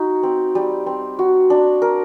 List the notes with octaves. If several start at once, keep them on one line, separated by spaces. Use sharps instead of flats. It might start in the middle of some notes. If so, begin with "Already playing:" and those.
Already playing: D#4 F#4
C4
G3
C4
F#4
D4
A#4